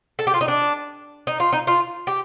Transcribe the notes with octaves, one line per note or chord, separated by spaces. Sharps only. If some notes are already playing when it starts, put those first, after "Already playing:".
A4
G4
F4
D#4
D4
D#4
F4
D#4
F4
G4